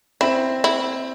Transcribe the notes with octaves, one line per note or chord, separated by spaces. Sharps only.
C4 E4
E4